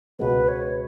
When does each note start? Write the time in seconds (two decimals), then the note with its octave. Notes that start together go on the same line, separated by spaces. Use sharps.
0.19 C#2 B2 G#3 B3 B4
0.48 C#5